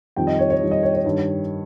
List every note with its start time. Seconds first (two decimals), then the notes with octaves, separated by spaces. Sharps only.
0.16 F2 D#3 G3 G5
0.27 D#5
0.38 C#5
0.50 C#5
0.61 F2 D#3 G3
0.71 D#5
0.83 C#5
0.94 C#5
1.05 G2 D#3 G3